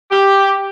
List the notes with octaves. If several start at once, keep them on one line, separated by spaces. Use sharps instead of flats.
G4